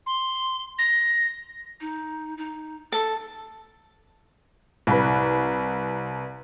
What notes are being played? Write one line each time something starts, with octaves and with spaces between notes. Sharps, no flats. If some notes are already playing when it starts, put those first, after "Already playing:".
C6
A#6
D#4
D#4
A4 A5
C2 B4